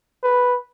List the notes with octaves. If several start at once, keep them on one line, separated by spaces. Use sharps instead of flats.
B4